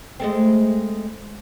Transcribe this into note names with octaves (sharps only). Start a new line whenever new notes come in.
G#3 A3 C4